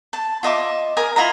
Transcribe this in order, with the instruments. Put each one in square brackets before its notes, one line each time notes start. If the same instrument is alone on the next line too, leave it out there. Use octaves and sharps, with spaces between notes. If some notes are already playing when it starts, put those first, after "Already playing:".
[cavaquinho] A5
F4 D#5 E5 D6
A#4 G#5 D#6
E4 F4 D#5 A#5